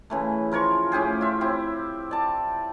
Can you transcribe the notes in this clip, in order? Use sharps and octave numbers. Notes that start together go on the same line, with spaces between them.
C#3 E3 A3
F3 A#4 C#5 C#6
A2 C#4 G4 G#4
F4 E5
C4 E4 G4
D5 A5